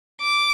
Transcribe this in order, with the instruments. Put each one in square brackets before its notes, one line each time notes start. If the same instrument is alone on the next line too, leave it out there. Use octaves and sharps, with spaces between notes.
[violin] D6